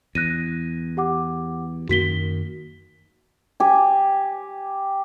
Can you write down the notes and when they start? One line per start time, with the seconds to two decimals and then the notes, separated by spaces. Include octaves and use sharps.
0.15 E2 F#6 A#6 D#7
0.97 G4 F#5 D6
1.89 F#2 D#3 A#3 F#4 B6 G7
3.60 G4 G#5